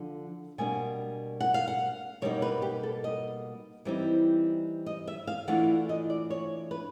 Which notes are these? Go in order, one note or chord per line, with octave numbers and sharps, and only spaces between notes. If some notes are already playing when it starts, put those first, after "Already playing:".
Already playing: D3 F3
B2 G3 A#3 D4 G#5
F#5
F5
F#5
B2 G3 A#3 D#4 C#5
B4
G4
A4
D#5
E3 G3 C4 D#4
D#5
E5
F5
E3 A3 D4 F4 F#5
D#5
D5
C#5
B4